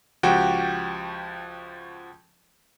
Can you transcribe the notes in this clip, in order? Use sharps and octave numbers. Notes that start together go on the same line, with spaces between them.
C#2 F3 F#4 G4 G5